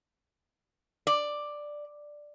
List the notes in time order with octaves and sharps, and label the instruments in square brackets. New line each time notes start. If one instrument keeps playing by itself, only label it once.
[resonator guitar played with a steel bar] D5